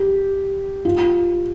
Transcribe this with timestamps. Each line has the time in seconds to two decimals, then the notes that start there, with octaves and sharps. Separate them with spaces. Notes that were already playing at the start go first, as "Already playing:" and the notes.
Already playing: G4
0.85 F4